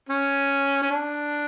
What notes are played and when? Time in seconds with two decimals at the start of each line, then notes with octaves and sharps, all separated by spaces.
0.09 C#4
0.82 C#4
0.91 D4